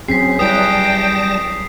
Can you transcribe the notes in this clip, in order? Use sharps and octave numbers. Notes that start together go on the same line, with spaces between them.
F#3 C4 C#4 G#4 B6 C7
G3 E4 B4 G5 A5 D#6 A#6